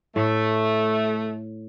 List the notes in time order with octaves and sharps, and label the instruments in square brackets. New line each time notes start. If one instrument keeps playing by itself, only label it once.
[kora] A2 [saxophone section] A3